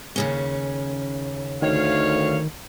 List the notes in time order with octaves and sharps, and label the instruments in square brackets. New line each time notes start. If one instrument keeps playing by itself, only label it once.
[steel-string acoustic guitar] D#2 C#3 C#4
[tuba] D2 [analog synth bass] D#3 [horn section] C#5 F5